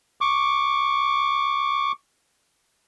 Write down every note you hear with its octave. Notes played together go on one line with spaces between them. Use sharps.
C#6 D6